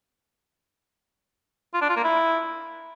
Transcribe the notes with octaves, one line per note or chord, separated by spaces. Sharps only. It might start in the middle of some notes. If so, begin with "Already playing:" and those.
F4
D4
F4
A#3
E4